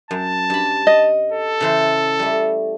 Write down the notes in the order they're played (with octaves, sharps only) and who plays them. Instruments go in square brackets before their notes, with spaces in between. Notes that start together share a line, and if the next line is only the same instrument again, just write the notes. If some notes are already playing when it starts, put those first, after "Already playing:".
[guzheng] F#2 [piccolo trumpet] A5
[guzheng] G2 B5
[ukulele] D#5
[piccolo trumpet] A4
[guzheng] C#3 E3 C5
G3 A3